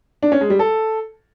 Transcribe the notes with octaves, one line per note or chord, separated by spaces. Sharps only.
D4
C#4
G#3
G3
A4